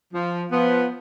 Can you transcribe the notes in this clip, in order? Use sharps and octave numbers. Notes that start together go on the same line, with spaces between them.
F3
F3 B3